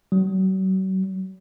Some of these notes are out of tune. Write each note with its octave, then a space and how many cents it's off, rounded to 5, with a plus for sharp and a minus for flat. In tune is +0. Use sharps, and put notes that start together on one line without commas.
F#3 +40